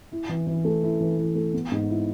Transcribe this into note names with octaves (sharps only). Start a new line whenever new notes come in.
E4
E3
E3
A3
E4
E3
E3
A3
B3
G#2
E4